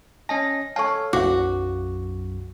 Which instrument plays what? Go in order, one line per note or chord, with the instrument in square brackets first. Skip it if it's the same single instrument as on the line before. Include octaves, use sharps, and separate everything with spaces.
[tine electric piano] C#4 D#5 A#6 [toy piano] A5
[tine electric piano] A4 C#5 F5 [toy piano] A5 C#6
[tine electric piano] B1 F#2 [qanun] F#4 [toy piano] F5 D6